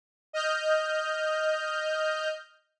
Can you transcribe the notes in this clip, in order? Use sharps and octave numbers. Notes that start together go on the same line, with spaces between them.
D#5 F6 G6